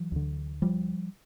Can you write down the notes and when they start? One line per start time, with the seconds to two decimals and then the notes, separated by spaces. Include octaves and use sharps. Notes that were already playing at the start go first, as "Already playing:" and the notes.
Already playing: E3 F#3
0.12 D2 D3
0.62 F3 G3